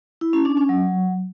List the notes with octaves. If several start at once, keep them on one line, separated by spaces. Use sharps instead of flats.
E4
C#4
D4
C#4
F#3